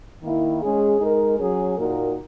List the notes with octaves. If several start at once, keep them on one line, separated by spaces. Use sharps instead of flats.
D#3 A#3 E4
G#3 C#4 G#4
G#3 D#4 A#4
F#3 C#4 G#4
A#2 A#3 D#4 F#4 A#4